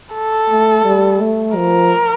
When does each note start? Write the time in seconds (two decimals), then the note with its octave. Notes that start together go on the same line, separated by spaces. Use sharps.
0.15 A4
0.50 A3
0.85 G3
1.21 A3
1.56 F3 A#4